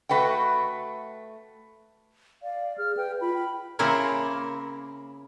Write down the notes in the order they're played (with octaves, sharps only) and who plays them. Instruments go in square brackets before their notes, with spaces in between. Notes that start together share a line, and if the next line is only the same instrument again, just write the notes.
[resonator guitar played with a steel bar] A3 F#4 B4 F#5 G5
[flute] D5 [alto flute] F5
[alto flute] G#4 [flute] F6
[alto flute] B4 [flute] G5
[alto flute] F4 [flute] B5
[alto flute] G5
[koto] C#3 A#3 C4 E4 A#4 C#5